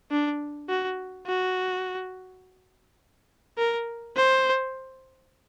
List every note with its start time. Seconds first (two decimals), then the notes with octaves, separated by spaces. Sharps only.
0.11 D4
0.69 F#4
1.27 F#4
3.58 A#4
4.16 C5